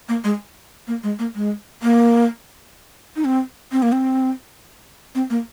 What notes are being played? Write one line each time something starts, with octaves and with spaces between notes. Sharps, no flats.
A#3
G#3
A#3
G#3
A#3
G#3
A#3
D#4
C4
C4
A#3
C4
C4
A#3